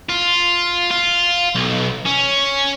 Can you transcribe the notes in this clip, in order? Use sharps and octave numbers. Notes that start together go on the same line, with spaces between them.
F4
F4
B1
C#4